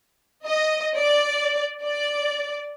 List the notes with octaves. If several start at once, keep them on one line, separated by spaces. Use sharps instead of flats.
D#5
D5
D5